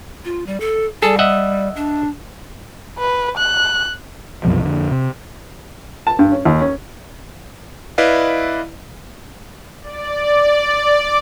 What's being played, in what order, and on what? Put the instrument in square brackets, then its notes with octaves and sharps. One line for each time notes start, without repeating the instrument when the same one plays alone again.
[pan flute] F4
G3
A4
[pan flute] G3 [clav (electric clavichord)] G#4 A4
[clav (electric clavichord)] D#5 E5 F#5
[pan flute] D4
[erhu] B4
F#6
[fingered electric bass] C2 F#2 B2 F3
F2 D3
C3
[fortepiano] A5
G2
C#4
D#2
C#4
[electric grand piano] E4 B4 D5 D#5 F5
[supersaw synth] D5